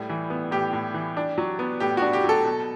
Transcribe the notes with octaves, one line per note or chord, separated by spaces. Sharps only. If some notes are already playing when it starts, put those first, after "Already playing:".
Already playing: A2 G3
E3
B3
A2 G4
A2
E3
D4
F#3
B3
A2 G4
D4 F#4
G4
F#3
A4
B2